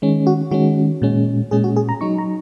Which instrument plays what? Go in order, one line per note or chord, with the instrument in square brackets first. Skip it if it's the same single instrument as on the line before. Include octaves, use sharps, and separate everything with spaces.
[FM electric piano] D#3 G#3 C#4
F#4
D#3 G#3 C#4 F#4
A#2 G#3 C#4
A#2 G#3 C#4 G#4
F#4
G#4
A#5
F#3 D#4 C#6
A#5